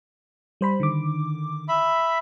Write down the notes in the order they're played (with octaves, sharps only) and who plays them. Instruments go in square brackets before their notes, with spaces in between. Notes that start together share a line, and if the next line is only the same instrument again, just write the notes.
[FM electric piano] G3 C5 B5
D3 D#3 D6
[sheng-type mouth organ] E5 B5